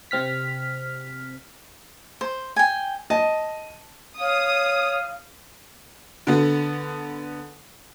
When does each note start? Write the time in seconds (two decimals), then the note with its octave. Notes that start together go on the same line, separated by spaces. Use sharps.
0.11 C3 C4 F6 B6
2.21 C5
2.56 G5 G#5
3.10 D#5 A5
4.19 C#5 F5 D#6
6.27 D3 B3